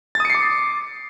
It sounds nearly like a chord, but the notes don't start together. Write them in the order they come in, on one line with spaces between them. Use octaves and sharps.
A6 D#6 C#7 C7 D6